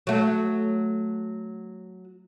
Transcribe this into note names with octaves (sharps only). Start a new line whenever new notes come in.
F#3 A3